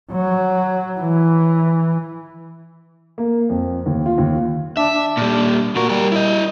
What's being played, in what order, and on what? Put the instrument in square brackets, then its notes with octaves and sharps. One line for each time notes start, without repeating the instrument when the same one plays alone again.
[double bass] F#3
E3
[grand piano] A#3
F2
D#2
F4
D#2
[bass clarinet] D4 [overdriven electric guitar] E5
[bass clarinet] D4
[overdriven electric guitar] A#2 G3
[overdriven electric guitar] A#2 A#4 [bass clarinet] F#4
[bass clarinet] G3 [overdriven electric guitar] G4 A#4
[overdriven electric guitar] E4 D#5